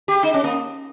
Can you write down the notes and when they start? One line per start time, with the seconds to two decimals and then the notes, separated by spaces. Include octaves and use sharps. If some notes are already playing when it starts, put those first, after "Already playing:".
0.08 G4
0.23 D#4
0.34 C#4
0.44 A#3